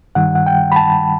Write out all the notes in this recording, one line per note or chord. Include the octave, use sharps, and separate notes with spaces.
G2 D#3 G3 F#5
F#5
G5
B5
A5